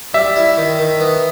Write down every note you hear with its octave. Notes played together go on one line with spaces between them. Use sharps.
G3 E5
E4
D#3
D#3
B3